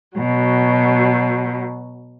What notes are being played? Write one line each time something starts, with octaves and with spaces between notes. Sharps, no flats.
B2 F#3